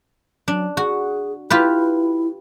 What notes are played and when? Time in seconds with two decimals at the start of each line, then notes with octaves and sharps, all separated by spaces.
0.48 F#3 D4
0.77 F#4 G#4
1.50 E4 F4 G4 B4